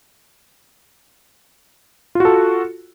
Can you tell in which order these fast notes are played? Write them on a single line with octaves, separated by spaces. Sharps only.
F4 F#4 A4